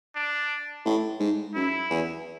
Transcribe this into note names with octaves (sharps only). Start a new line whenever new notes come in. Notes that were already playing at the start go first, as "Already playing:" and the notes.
D4
A2
G#2
F#2 E4
E2